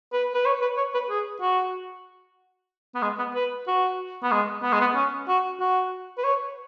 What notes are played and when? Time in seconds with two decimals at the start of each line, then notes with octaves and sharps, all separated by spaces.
0.13 B4
0.35 B4
0.46 C#5
0.62 B4
0.77 C#5
0.94 B4
1.10 G#4
1.41 F#4
2.95 B3
3.02 G#3
3.19 B3
3.35 B4
3.68 F#4
4.23 B3
4.32 G#3
4.63 B3
4.73 G#3
4.81 B3
4.95 C#4
5.28 F#4
5.60 F#4
6.18 B4
6.24 C#5